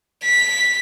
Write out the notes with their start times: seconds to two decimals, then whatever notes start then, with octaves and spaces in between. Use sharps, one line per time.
0.24 B6